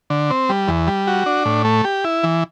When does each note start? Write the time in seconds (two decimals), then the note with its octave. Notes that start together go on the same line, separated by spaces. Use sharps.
0.10 D3
0.30 C4
0.49 G3
0.68 E2
0.87 G3
1.07 F#4
1.26 D4
1.45 A2
1.65 A3
1.84 G4
2.05 E4
2.23 E3